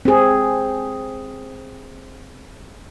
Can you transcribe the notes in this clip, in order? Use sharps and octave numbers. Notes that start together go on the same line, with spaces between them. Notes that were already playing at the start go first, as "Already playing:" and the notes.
C4 G#4